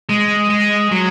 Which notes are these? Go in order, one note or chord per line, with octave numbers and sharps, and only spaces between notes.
G#3
G#3
F#3